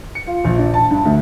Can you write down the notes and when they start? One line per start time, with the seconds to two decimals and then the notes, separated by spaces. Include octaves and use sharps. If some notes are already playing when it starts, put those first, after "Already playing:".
0.15 C#7
0.27 F4
0.45 A#1
0.59 D4
0.74 A5
0.91 G2
1.05 D2